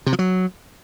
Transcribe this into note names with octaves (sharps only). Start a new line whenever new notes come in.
C3
F3
F#3